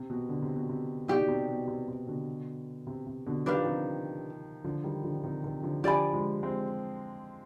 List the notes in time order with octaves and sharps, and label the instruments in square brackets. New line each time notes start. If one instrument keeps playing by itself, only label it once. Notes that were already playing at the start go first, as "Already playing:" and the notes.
Already playing: [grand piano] C3
B2
D3
C3
B2
C3
[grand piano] B2 [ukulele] D#4 G4 D5
[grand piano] B2
C3
B2
C3
C3
B2 D3
C3
C3
B2 D3
[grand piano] D#3 [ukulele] D4 G4 B4 F5
[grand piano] F3
C3 D#3
D3 F3
D#3 G3
D3 F3
D3
C3 D#3
C3 D#3
D3 F3
[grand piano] D3 F3 [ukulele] G4 D5 G#5 B5
[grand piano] F3 G#3
G#3 C4